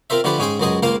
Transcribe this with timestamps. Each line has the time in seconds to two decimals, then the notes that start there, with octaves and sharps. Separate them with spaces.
0.10 C4 F4 A#4 C5 E5
0.24 D3 F3 A3 G4 B4 C5
0.39 G#2 C#4 G#4 G5 C6
0.60 C#2 F#2 F#3 G#4 C5 D#5
0.83 C#2 A#3 F4 C5 F5